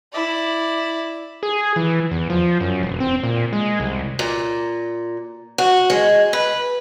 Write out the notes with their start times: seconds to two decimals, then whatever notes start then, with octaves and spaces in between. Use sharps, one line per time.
0.12 E4 D5
1.43 G#4
1.76 E3
2.11 E2
2.30 F3
2.61 F#2
2.83 E1
3.00 C4
3.23 A#2
3.53 G#3
3.80 C2
4.19 A#2
5.58 F#4
5.90 G#3
6.33 B4